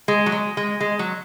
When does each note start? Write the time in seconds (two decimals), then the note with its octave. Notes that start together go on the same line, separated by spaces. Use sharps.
0.08 G#3
0.26 F#3
0.32 G#3
0.57 G#3
0.81 G#3
0.99 F#3